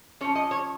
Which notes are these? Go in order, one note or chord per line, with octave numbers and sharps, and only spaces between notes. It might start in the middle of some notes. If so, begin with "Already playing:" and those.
F3 C#4 C#5
D#5
C#5